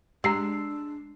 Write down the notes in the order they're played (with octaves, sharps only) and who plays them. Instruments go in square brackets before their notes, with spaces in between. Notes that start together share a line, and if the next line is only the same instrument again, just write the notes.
[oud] G#3 [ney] D4 [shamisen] G4 A#5 [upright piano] E6 C7